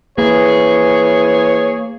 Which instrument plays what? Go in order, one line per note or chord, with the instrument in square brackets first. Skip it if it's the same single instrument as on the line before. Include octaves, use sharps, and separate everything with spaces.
[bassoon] E3 [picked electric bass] A#3 [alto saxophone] G#4 [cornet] C#5